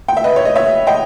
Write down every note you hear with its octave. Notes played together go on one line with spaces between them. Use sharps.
G5
E5
B4 D#5
C#5
D#5
C#5 E5
D#5 G5